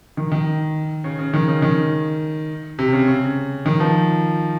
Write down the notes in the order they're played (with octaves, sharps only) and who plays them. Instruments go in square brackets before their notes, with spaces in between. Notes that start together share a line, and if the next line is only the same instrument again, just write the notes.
[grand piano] D#3
D#3
C#3
C#3
D#3
C#3
D#3
C3
C#3
C#3
D#3
F3